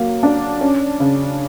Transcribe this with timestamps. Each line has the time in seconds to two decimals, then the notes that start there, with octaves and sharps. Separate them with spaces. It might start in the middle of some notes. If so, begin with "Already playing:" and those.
Already playing: F#3 A#3
0.23 D4
0.61 C#4
1.00 C#3